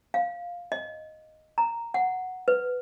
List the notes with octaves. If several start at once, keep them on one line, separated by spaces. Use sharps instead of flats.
F5
D#5
A#5
F#5
B4